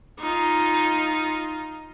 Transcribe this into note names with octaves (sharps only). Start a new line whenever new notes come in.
D#4 F4